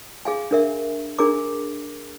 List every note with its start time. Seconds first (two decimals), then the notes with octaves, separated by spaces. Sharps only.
0.25 G#4 F5 G#5
0.51 D4 A#4 E5
1.19 D4 G#4 A#4 A#5 D6